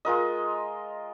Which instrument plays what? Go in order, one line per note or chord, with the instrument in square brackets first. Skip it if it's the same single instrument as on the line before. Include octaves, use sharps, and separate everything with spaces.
[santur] G#3 F4 A#4 D#5